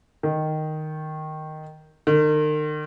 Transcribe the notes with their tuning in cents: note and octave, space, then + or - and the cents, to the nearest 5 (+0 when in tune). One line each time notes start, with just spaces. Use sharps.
D#3 -5
D#3 -40